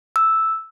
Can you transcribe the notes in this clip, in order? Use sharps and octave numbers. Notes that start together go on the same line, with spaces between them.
E6